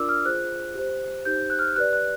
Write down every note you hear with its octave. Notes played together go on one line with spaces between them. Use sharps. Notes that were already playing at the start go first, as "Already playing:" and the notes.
Already playing: D4 F4 A#4 D5 D6 E6
F6
F4 G#4 C5 F#6
G4 C5
D#4 G4 C5 G6
F#6
F6
G4 B4 D5 F#6
F#6